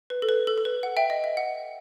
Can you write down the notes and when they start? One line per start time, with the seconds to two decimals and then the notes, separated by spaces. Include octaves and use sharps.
0.10 B4
0.22 A4
0.29 B4
0.47 A4
0.58 A4
0.65 B4
0.83 F#5
0.97 E5 G5
1.10 D#5
1.24 E5
1.37 F#5